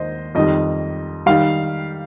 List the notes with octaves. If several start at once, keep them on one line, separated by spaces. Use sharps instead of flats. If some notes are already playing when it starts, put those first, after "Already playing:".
Already playing: D#2 C5 D#5
F2 D#3 G3 D#5
D#3 G3 F5